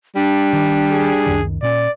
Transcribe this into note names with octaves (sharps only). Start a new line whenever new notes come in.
G3 D4
D#3
G#4
C#2 F#2 D#3
A#2 C#4 D5